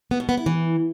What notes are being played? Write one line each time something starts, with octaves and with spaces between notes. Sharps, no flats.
B3
B2
B3
E4
E3